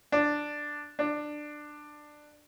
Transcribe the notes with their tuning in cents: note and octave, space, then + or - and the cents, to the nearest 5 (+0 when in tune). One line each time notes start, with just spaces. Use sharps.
D4 +5
D4 +15